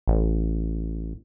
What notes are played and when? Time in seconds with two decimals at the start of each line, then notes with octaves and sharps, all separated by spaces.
0.08 A1